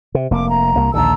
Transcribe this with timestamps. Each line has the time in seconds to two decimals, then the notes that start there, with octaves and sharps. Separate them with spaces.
0.15 C3
0.31 F1 A#3 D6
0.48 A#5
0.76 C2 A#3
0.94 A#1 D#2 D3 A5 A#5 E6